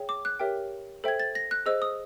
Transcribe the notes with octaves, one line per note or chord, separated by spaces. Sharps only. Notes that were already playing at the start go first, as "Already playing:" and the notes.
Already playing: G#4 C#5 E5 G5
D6
F#6
G4 A#4 C#5 E5 G5
A4 C5 E5 G5 G#6
A6
A#6
F#6
G#4 C5 D#5 E6
D#6